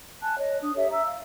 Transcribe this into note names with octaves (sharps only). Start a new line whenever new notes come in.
G#5 A5 F#6
C#5 D#5
D4 D#6
G4 A4 C#5 E5
E5 A#5 E6
F5